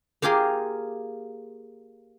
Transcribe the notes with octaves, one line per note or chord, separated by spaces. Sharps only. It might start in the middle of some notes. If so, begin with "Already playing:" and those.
A#3 F4 G4 G#4 A#4